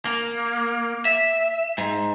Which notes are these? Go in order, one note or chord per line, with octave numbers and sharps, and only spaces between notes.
A#3
E5
G#2